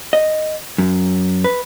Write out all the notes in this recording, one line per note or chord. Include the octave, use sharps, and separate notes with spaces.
D#5
F#2
B4